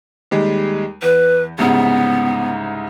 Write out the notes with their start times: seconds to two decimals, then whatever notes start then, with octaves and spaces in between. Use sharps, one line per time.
0.31 D#2 G3 G#3
1.02 E2 B4
1.58 C2 G#2 C#3 B3